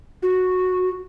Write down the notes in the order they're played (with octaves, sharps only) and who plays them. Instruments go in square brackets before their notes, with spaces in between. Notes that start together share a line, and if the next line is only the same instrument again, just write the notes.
[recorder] F#4